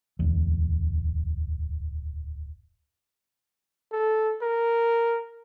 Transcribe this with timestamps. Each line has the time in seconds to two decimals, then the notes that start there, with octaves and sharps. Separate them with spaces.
0.19 D1 E2
3.92 A4
4.42 A#4